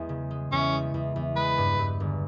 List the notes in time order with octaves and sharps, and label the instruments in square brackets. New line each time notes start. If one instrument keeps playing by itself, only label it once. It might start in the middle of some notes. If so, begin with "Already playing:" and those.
Already playing: [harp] E2 G#3
C#3
G#3
[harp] E2 [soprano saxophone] C#4
[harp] G#3
E2
E2
[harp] G#3 [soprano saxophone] B4
[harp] G2
G2
G1